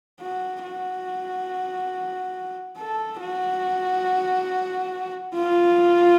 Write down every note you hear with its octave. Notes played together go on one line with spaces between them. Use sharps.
F#4
F#4
A4
F#4
F4